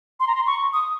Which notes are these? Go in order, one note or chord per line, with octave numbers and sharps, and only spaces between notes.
C6
A#5
C6
C#6
D#6